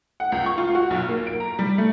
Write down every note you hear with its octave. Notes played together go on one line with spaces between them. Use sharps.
F#5
C#2
C#6
F4
F#4
B1
A#3
D7
A#5
G3
A3